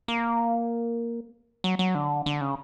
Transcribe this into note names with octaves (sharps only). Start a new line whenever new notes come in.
A#3
F#3
F#3
D3
D3
C#3